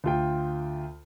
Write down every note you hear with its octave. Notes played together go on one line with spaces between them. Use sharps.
D2 F4 G5